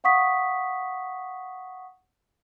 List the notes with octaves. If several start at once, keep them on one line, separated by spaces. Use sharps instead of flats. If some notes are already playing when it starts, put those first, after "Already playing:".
F5 F#5 C#6 D#6 B6